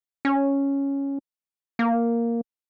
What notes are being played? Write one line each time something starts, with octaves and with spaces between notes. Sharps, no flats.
C#4
A#3